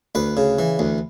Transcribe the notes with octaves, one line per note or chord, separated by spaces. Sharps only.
D2 B4
C#3
E3
D2